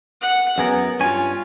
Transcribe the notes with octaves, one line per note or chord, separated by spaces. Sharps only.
F#5
F#2 B3 G#4 A#4
G2 C#4 F4 G#5